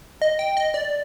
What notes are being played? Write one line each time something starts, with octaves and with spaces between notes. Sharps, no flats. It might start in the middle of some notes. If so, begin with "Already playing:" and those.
D#5
G5
D#5
D5